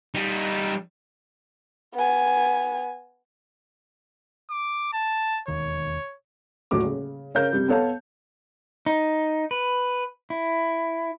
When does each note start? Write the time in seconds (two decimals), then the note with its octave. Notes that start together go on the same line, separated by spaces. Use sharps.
0.14 G3 D#4
1.94 B3 G#5
4.50 D6
4.93 A5
5.48 E1 D#2 D#3 C#5
6.71 D#1 A2 F#3 F#4 D6
6.84 C#3
7.34 C#3 C#4 A#4 F5 G6
7.53 C3 G3
7.68 B3 A4 C#5 F5 A5
8.86 D#4
9.51 B4
10.30 E4